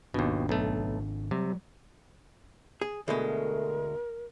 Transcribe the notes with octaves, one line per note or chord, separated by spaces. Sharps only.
G#1 D#2 B2 D4
B1 A3
C3 F#3 G3
G#4
D2 B2 G#3 A3 A#4